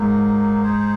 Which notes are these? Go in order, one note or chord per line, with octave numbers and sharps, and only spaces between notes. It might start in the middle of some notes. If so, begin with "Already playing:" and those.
Already playing: G#2 F#3 G#3 A#3 D#4
D#4 G#4 C5